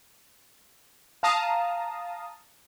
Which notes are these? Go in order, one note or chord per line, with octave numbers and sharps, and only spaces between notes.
F5 A5 A#5 D#6